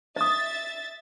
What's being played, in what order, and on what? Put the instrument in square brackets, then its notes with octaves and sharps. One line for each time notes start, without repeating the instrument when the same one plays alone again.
[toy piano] D#5 D#6 [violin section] E5 A6